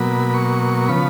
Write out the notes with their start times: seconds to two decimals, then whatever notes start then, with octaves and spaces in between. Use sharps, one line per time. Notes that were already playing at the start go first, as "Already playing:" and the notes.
Already playing: B2 F#3 A#3 B5
0.34 C#6
0.88 C#3 F3 B3 B5